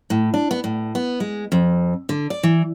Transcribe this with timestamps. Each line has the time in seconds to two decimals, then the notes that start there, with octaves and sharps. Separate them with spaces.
0.10 A2
0.34 D4
0.51 B3
0.64 A2
0.95 B3
1.20 G#3
1.52 F2
2.09 D3
2.30 D5
2.43 E3